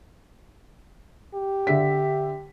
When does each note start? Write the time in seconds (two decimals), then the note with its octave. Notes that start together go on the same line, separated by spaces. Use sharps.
1.35 G4
1.67 D3 E5 B6